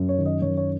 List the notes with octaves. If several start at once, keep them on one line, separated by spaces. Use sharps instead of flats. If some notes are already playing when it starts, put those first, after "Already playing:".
Already playing: F#2
C#5
D#3
D#5
F#2 C#5
C#5